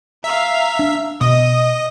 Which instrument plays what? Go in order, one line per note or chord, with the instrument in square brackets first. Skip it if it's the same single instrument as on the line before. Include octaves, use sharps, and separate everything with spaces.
[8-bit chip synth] E5 [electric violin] F5 A#5
[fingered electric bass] D4
[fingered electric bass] B2 [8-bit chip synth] D#5 [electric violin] D#6